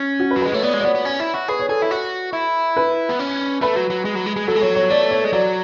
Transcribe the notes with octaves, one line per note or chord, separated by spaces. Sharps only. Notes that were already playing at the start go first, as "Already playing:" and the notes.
Already playing: C#4
F#4
B4
F#3
G#3 B4
A3 C#5
B3 D5
G#3
D5
B3 C#5
B3
C#4
E4
F#4
G#4 B4
C#5
G#4 A4
E4
F#4
E4
B4
B3
C#4
A3 B4
F#3
F#3
G#3
F#3
G#3
G#3
F#3 A4
G#3
F#3 C#5
C#5
A3 D5
C#5
G#3
F#3 D5